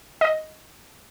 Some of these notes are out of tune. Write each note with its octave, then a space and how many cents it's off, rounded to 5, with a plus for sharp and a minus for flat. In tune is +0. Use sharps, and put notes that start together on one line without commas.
D#5 +5